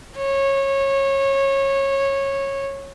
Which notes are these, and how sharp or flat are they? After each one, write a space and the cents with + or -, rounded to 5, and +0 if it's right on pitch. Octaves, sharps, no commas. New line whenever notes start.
C#5 -20